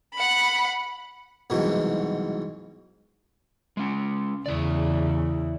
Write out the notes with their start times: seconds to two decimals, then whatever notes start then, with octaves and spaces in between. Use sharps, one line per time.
0.14 F#5 B5
1.50 C2 G#2 B2 E3 F#3
3.77 G#3 C#4
4.46 E2 C#3 E4 D5